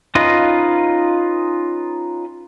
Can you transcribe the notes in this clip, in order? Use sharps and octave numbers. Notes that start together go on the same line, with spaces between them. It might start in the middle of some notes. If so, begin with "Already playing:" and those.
C#4 D#4 F4 B4 D#5